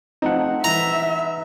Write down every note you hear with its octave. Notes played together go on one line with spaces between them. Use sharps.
F3 A3 C4 D#4 F#5
E3 B4 E5 A#5